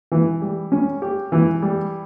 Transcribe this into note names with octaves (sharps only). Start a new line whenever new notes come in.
E3
G3
C#4
G4
E3
G3